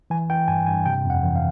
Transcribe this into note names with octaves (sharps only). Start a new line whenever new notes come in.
E3 G#5
E3 G5
G2 G#5
G2 G#5
C3 G5
F2
F#5
E3
F5